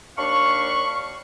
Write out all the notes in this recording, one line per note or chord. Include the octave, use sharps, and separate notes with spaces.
D#2 D4 F5 B5 C#6